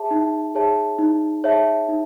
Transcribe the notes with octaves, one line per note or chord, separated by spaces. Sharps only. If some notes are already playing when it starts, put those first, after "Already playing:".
Already playing: G#4 C#5 E5 A5
D#4
G#4 C#5 E5 A5
D#4
G#4 C#5 E5 A5
D#4